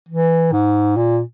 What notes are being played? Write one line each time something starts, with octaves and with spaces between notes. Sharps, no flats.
E3
G#2
A#2